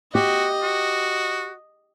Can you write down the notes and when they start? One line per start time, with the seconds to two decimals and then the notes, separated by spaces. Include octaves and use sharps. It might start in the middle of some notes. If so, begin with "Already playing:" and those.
0.15 F#4 G4 D#5
0.63 F#4